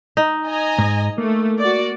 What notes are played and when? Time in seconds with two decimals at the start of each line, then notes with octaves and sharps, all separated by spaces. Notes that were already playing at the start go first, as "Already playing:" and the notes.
0.17 D#4
0.47 D#5 G#5 A#5
0.79 G#2
1.18 A3 A#3
1.60 F#4 D5